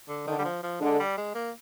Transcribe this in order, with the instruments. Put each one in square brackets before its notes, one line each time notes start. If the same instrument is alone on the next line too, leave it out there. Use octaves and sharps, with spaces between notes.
[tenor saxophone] D3
[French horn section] D3 [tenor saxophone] D#3
[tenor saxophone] G3
F3
F3
[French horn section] D3 [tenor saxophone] G#3
[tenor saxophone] G3
G#3
A#3